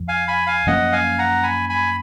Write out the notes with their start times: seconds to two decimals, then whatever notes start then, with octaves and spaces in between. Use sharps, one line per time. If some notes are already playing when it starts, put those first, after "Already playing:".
Already playing: F2 F3
0.08 F5 G#5
0.28 G#5 B5
0.47 F5 G#5
0.66 F#2 F3 A#3 C#4 D#5 F#5
0.92 F5 G#5
1.19 F#5 A#5
1.43 G#5 B5
1.69 G#5 B5